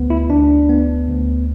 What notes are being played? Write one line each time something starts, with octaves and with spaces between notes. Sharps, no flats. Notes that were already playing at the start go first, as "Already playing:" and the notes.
Already playing: D2 B3
E4
D2 D4
B3
D2